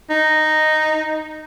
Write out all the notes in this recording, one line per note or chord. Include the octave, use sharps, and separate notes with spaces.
D#4